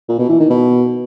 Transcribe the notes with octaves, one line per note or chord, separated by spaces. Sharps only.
A#2
B2
E3
D#3
B2